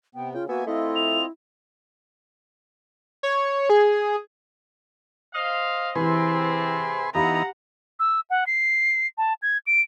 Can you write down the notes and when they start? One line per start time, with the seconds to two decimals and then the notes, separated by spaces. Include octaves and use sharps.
0.15 C3 B3 G5
0.34 C#3 F4 G5
0.49 A#3 B3 F#4 E5 G#5
0.67 A3 C4 E4 F4 D#5
0.96 F7
3.23 C#5
3.70 G#4
5.34 C5 D#5 F5
5.95 C3 E3 C4 E4 G#4 B4 C6
7.15 E3 B3 D#4 G4 F5 F#5 A#5 B5
7.99 E6
8.30 F#5
8.47 C7
9.18 A5
9.42 G#6
9.67 D7